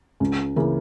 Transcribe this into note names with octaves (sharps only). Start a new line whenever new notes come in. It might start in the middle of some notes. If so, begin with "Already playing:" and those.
C#2
C#3 E3 A#3